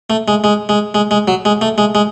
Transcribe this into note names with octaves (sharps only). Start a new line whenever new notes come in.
A3
G#3
G#3
G#3
G#3
G#3
F#3
G#3
A3
G#3
G#3